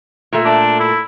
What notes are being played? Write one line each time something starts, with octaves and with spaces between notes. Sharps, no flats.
A#2 A3
D4
E4